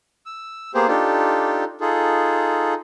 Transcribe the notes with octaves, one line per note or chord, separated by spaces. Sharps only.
E6
A#3 B3 G4 G#4 C5
D4 D#4 F4 G4 A4
D#4 F4 G#4 A4